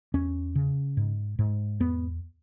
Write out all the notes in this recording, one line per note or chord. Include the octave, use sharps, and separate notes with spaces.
E2 C#4
C#3
G#2
G#2
E2 B3